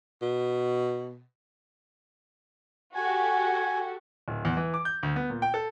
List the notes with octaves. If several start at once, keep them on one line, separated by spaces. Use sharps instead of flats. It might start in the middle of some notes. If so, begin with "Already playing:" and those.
B2
F#4 G4 A4 G#5
D1
E2
E3
D6
G6
D2
B3
A#2
G5
A4